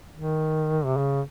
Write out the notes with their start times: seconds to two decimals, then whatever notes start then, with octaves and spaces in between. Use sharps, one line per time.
0.15 D#3
0.85 C3
0.97 C#3